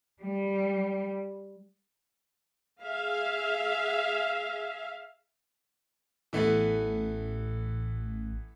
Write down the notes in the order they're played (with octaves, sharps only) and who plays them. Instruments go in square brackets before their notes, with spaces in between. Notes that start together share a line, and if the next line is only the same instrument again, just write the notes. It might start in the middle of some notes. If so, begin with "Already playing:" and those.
[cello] G3
[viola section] G#4 E5 F5
[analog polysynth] A1 [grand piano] E3 A3 B3